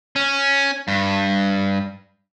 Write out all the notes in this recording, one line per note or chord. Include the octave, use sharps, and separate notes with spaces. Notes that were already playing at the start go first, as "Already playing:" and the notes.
C#4
G2